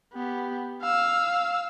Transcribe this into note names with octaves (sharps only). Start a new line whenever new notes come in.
B3 G4
F5 E6